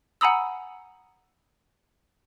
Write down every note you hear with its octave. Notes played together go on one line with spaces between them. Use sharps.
F#5 G#5 A#5 B5 D#6 E6